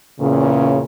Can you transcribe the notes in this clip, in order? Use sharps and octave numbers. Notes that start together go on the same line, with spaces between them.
E2 A#2 C#3